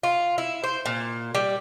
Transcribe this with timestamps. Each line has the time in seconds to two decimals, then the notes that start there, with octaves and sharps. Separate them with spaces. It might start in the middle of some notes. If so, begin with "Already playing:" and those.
0.03 F4
0.38 E4
0.64 C5
0.86 A#2
1.35 G3